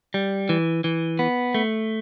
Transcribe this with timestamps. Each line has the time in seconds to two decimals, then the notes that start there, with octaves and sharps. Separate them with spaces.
0.14 G3
0.49 E3
0.84 E3
1.19 B3
1.54 A3